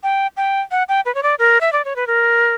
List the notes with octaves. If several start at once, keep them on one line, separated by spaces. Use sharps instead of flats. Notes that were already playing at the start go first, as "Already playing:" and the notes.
G5
G5
F#5
G5
B4
C#5
D5
A#4
E5
D5
C#5
B4
A#4